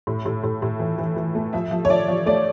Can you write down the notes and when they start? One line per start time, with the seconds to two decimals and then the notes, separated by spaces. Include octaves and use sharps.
0.07 A2
0.26 A2
0.43 A2
0.62 A2
0.80 E3
0.98 E3
1.16 E3
1.35 A3
1.53 F3 E5
1.71 F3
1.85 C#5
1.90 F3 D5
2.08 F3
2.26 A3 D5